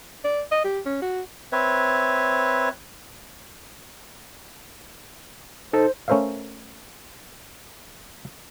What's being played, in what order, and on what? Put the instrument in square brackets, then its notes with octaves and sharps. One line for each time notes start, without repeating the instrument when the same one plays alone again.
[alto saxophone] D5
D#5
G4
C#4
F#4
[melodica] C4 B4 C#5 E5
[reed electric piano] D#4 A4 [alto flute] C5
[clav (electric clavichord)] A3 C#4 A#4 C5 E5 F5